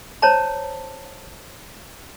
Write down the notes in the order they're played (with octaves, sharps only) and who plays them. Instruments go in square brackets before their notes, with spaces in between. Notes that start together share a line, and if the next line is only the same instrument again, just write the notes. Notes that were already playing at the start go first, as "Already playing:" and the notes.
[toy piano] C5 C#5 A5 A#5